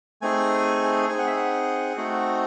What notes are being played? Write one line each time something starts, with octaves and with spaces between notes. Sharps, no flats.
A3 C4 D#4 G#4 G#5
C4 D#4 G#4 G#5
F#5
E5
F#5
A3 C4 D#4 F#4